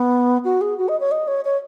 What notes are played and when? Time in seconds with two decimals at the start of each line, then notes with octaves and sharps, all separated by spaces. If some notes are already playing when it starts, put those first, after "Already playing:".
Already playing: B3
0.44 F#4
0.61 G#4
0.78 F#4
0.88 D#5
1.00 C#5
1.11 D#5
1.28 C#5
1.45 C#5